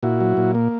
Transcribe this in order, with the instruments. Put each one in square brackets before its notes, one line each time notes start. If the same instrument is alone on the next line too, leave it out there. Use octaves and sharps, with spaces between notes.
[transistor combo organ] A#2 E4 F#4
F#3
A#2
A#3